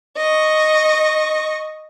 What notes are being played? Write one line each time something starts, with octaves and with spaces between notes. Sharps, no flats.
D#5 C#6